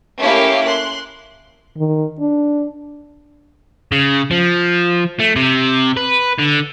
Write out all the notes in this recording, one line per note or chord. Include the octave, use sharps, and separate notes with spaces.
A3 A#3 C#4 E4 G4 F5
C6 F#6
D#3
D4
C#3
F3
A3
C3
B4
D3